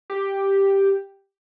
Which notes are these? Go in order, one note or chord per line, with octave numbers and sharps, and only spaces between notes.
G4